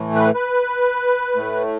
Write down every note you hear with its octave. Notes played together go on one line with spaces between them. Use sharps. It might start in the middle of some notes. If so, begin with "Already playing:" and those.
Already playing: A2 E3 A3
B4
B4
A2 A3